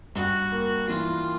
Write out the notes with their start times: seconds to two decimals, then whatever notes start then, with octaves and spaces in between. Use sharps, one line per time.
0.15 G2 F#4
0.52 A#3
0.89 E3 F4